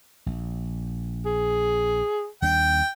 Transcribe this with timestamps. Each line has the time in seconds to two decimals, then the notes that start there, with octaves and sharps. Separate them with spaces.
0.26 A#1
1.26 G#4
2.42 D#2 G3 D4 G5